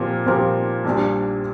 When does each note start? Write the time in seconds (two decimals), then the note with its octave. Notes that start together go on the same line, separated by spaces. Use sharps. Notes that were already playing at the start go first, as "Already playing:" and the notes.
Already playing: A#2 F3 C4 G4 A#4
0.26 A#2 F3 C4 G4 A#4
0.85 A#1 A#2 G3 D4